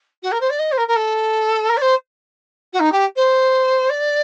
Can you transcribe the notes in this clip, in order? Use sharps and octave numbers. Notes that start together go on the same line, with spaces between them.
F#4
A#4
C5
D5
D#5
C5
A#4
A#4
A4
A#4
D5
C5
F#4
D#4
G4
C5
D5